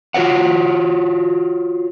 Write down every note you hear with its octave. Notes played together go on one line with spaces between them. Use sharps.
F4 F#4 A4 A#4 C#5 F#5